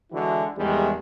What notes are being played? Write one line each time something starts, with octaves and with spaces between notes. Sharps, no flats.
D3 E3 G#3 E4 F#4
A1 E2 D#3 G3 G#3